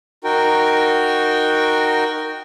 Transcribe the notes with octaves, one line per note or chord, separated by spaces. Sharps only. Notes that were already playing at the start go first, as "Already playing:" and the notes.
D#4 F#4 A#4 G5